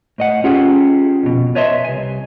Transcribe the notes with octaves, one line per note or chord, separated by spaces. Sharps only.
A2 D#5 F#5
C#4 F4 G4 G#4 F#5
F2 B2
B4 C#5 D#5 E5 A5 C6
C2 G#5